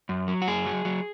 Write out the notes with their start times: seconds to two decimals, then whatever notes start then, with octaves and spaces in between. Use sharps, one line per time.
0.09 F#2
0.28 F#3
0.42 F#4
0.47 F#2 G#4
0.66 F#3
0.85 F#3